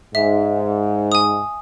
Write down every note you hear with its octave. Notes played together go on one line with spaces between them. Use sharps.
G#2 E5
G#5 D#6